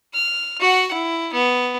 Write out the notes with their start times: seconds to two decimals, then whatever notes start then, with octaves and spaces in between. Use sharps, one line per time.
0.14 F6
0.61 F#4 F#5
0.93 E4
1.33 B3